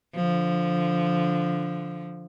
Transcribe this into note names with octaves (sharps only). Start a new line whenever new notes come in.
D3 F3